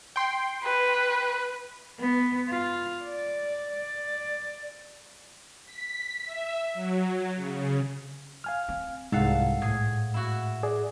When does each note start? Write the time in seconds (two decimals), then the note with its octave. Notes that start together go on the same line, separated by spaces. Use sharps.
0.16 G5 C6
0.64 B4
2.00 B3
2.49 F4
3.03 D5
3.72 D5
5.66 B6
6.25 E5
6.74 F#3
7.36 C#3
8.44 F5 G#5 F6
8.69 C4
9.12 C2 G#2 A4 F5 F#5
9.62 A2 G#4
10.14 E4 F#4
10.63 G#4 D5